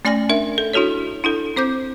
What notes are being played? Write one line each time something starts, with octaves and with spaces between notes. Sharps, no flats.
A3 C#4 D5 G#5 F6 A#6
D4 A#4 E5
A4
D4 E4 F#4 A4 C#5
D4 E4 A4
C4 C5 D6 G6